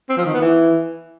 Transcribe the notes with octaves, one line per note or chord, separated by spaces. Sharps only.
C4
F3
D#3
B3
E3